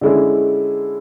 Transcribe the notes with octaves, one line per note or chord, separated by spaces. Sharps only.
D3 G#3 C#4 E4